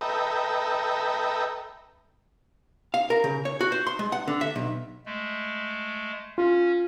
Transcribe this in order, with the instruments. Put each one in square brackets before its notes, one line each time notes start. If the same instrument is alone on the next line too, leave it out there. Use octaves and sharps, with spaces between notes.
[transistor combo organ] A4 B4 D#5 E5 G5 A#5
[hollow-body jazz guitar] F5
A#4
C#3
C#5
F#4
C5
C6
G#3
F#5
D3
E5
B1
[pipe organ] G#3 A3
[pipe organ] C#4 [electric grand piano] F4